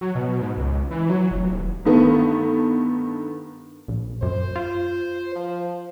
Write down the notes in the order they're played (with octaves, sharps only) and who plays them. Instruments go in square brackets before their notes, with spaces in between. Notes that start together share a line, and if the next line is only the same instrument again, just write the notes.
[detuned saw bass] F#3
B2
G#2
C#2
E3
F#3
F1
D#1
[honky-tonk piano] G2 D3 D#3 A3 B3
[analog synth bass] A#1
[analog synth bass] F#2 [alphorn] C5
[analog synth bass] F4
[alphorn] F3